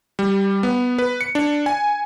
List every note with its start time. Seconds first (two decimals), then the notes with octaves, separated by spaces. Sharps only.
0.19 G3
0.63 B3
0.98 B4
1.21 C#7
1.35 D4
1.66 G#5